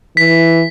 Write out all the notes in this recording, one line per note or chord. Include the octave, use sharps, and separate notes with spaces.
E3 B6